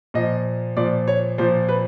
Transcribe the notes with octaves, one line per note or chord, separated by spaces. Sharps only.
A#2 F3 D#5
A#2 F3 D5
C#5
A#2 F3 C5
B4